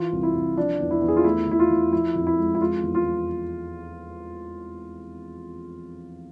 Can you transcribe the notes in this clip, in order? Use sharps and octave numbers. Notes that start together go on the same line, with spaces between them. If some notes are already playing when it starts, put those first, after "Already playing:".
Already playing: E3 F4
C2
E4
C2
F3 D4
E2
E4
E2
G#4
F4
A3 E4
E2 E4
F4
E2
F3 E4
F2
E4
G#3
E4
G#3 F4
E2
F4
E2